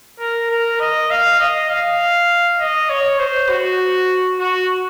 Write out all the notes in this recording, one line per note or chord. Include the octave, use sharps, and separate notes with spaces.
A#4
A#4
D#5
F5
D#5
F5
D#5
C#5
C5
F#4
F#4